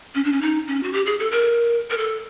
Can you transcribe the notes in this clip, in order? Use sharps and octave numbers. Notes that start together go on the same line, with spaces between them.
C#4
D4
C#4
D#4
C#4
F#4
G4
G#4
A4
A#4
A#4
A4